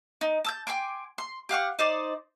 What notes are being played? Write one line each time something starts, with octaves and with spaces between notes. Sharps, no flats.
D#4
A5 E6 G6
G5 G#5 C6 D6
C6
G4 F5 F#5 C#6
D#4 C5 D5